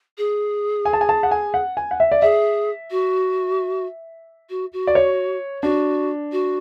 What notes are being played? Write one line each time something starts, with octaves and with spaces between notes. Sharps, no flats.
G#4
G#5
A5
G#5
A5
F#5
G#5
F#5
G#5
F#5
E5
D5
G#4 E5
F#4
F#4
F#4
D5
C#5
D4 F#4
F#4